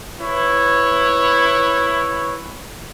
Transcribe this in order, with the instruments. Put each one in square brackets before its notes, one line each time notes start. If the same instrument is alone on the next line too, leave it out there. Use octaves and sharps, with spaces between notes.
[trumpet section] E4 B4 C#5